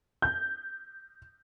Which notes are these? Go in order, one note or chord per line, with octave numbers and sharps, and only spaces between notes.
G6